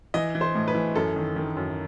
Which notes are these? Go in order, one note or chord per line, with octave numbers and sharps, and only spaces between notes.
E3 D#5
E3
C5
A2
B4
E3
F#2 A4
D#3
D#3
F#2